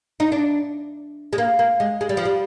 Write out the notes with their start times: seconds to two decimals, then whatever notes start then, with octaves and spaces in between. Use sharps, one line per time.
0.20 D#4
0.32 D4
1.33 G#3
1.38 A#3
1.59 A#3
1.80 G#3
2.01 G#3
2.09 G3
2.17 F3
2.25 G3